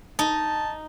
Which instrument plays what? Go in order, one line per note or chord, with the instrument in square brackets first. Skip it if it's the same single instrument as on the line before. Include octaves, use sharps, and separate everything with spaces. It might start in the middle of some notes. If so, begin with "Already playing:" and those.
[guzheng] D#4 [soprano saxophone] A5